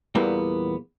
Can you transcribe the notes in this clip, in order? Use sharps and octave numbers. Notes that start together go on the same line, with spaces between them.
E2 A#2 E3 G3 A#3 B3